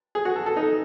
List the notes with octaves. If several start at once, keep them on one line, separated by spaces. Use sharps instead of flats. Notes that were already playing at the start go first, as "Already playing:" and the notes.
G#4
F#4
A4
A4
D#4